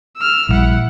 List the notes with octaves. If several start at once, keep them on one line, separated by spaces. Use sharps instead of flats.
E6 F6
A#1 G3 E4 F#5